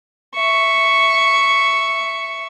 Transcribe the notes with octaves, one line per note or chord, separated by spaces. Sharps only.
E5 C#6